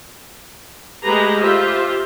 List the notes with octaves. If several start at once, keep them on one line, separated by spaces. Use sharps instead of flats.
G#3 A3 G4 G#4 B4 A#5
F4 G4 C5 E5